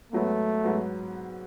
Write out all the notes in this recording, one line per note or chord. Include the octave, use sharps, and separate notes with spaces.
G#2 F#3 A3 B3
G#2 F#3 B3